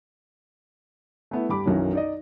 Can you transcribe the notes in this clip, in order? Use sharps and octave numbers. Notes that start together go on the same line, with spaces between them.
A3 B3 E4
G2 G4 B5 D6
B1 F#2 D#3 E3 F#3
D#4 D5 D#5